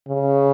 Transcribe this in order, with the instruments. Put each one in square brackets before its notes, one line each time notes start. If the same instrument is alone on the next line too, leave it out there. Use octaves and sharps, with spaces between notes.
[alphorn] C#3